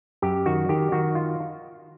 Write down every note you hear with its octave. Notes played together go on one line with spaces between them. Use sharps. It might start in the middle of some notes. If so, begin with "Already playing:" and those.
F#2 G4
D#3 F#4
D#3 G4
D#3 F#4
F4